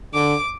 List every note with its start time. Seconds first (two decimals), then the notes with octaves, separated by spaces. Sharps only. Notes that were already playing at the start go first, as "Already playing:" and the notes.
0.14 D3 D6